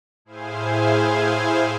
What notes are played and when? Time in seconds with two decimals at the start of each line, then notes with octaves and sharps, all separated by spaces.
0.25 A2 E4 G#4 C5 F5 G#5